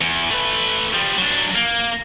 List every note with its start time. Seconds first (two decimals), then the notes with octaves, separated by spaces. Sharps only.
0.01 E2
0.31 A3 B4
0.94 F3 G3
1.18 F#3 D4
1.55 A#3